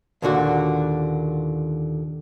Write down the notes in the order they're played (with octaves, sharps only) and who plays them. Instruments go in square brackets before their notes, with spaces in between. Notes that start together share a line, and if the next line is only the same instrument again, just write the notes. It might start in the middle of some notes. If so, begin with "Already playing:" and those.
[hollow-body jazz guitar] D#2 A#2 D3 F#4